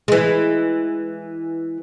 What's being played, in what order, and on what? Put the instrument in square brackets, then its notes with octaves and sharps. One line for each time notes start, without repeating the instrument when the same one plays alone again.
[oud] E3 G#3